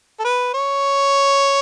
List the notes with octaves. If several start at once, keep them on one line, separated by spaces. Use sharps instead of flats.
A4
B4
C#5